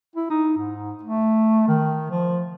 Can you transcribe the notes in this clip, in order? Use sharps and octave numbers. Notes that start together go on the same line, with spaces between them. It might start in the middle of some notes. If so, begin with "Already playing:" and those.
E4
D#4
G#2
A3
D#3
F3